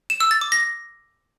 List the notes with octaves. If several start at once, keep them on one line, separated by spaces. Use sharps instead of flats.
E7
E6
A6
D6
A#6